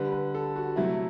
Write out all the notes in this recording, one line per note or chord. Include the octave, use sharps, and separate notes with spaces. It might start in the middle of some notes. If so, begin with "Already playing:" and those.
Already playing: D3 G3 B4
B4
A4
F#4
C3 F#3 A3 E4